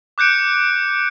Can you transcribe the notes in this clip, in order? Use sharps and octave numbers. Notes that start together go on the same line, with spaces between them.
D6 F#6 G6 C#7 D7